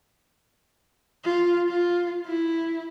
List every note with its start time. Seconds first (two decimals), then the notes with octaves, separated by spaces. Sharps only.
1.25 F4
1.69 F4
2.26 E4